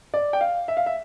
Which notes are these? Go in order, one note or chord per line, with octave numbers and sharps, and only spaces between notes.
D5
G5
F5
E5
F5
E5